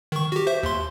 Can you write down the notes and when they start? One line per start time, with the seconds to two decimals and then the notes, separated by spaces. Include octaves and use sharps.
0.12 D#3 C#6
0.32 F#4 G4
0.47 C5 E5
0.63 D#2 C6